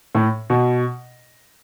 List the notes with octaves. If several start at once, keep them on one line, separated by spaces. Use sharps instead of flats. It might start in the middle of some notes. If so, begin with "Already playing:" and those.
A2
B2